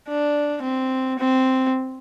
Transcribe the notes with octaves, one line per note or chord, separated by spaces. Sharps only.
D4
C4
C4